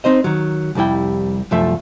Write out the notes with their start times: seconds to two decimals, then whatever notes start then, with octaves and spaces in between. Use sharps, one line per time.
0.04 C4 D#4 C5 D#5
0.24 D#3 F#3
0.75 C2 F2 G3 E4 G5
1.51 C2 F#2 F3 A3 E5